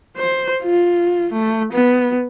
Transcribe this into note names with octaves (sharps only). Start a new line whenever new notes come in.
C5
F4
A3
B3